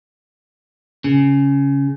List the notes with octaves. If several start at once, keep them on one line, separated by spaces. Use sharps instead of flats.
C#3